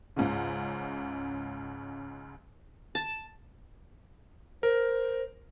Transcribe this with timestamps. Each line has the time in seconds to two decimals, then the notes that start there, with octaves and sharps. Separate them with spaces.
0.16 C#2 G#2 C#3
2.95 A5
4.63 A#4 C5